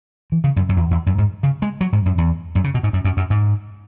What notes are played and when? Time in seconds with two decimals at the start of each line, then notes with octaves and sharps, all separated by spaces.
0.32 E3
0.44 C#3
0.56 F#2
0.69 F#2
0.76 E2
0.91 E2
1.06 F#2
1.18 G#2
1.43 C#3
1.62 G#3
1.81 F#3
1.93 G#2
2.06 F#2
2.18 E2
2.55 F#2
2.64 C#3
2.74 B2
2.83 G#2
2.93 F#2
3.04 F#2
3.17 F#2
3.30 G#2